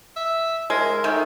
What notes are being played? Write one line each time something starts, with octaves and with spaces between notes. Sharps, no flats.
E5
G#3 A#4
D#3 A3